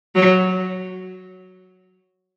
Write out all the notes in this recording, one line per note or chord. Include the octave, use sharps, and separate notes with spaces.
F#3